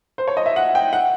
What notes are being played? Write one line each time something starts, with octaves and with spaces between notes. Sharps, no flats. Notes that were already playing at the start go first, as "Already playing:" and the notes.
C5
C#5
D#5
E5
F#5
G5
F#5